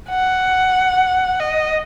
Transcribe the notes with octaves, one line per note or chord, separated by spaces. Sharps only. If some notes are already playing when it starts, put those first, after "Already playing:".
F#5
D#5